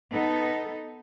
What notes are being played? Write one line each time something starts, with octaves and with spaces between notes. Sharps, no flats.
B3 D#4 A4